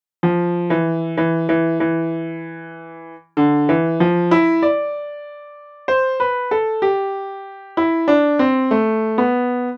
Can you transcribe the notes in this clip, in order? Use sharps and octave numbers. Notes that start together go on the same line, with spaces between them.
F3
E3
E3
E3
E3
D3
E3
F3
E4
D5
C5
B4
A4
G4
E4
D4
C4
A3
B3